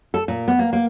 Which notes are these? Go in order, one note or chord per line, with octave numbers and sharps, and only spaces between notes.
A4
A#2
B3
A#3
A#3